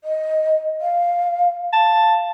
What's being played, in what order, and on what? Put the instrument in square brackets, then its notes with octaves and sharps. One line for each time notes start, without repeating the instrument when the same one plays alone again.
[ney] D#5
F5
[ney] F5 [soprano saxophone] A5